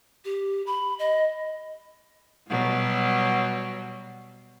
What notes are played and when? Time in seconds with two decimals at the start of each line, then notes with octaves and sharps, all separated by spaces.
0.25 G4
0.67 B5
0.99 D#5
2.50 B2 F#3 G3